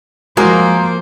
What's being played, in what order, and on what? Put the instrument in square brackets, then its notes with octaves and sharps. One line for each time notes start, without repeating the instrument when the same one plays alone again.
[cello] F3 C5 [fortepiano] G#3 [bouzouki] A#3 [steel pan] F#4